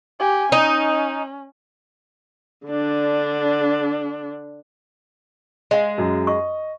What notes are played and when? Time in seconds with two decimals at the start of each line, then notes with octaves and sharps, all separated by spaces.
0.20 G4 G#5
0.52 C#4 D#4
2.67 D3 D4
5.71 G#3 D#5 F5
5.98 F#2
6.27 D#5 C#6